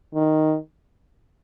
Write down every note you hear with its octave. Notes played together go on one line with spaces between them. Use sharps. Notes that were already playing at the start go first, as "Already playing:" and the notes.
D#3